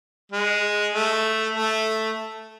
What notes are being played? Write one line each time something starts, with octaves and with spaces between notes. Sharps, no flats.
G#3
A3
A3